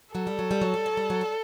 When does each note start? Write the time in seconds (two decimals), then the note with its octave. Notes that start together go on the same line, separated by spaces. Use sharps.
0.15 F#3 A4
0.27 G3
0.39 F#3
0.51 G3
0.61 F#3
0.74 G3
0.86 F#3
0.97 G3
1.10 F#3
1.21 G3